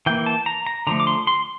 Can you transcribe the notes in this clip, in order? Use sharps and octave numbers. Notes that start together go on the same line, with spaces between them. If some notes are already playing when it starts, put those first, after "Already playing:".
E3 A#3 G5
A5
A#5
A#5
D3 F3 A3 A#5
D6
C6
C6